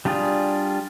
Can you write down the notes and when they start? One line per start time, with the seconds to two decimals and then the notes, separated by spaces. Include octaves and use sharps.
0.05 G3 D4 F4 G#4